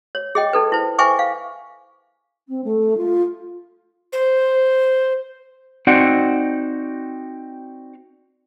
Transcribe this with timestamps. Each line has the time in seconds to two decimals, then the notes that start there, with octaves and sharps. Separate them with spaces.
0.15 C#5
0.35 G#4 D#5 G5
0.53 D#4 A4 B4
0.72 E4 C5
0.99 C5 E5 G5 G#5 C#6 D6
1.19 F5
2.48 C4
2.64 A3
2.97 F4
4.13 C5
5.87 C4 D#4 F#4 D5 F#5